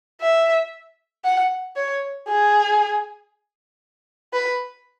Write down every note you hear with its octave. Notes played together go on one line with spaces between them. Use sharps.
E5
F#5
C#5
G#4
B4